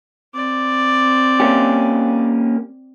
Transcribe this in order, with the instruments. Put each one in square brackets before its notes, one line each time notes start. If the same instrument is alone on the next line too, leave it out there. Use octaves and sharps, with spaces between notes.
[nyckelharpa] C4 D5
[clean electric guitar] A#3 C#4 G4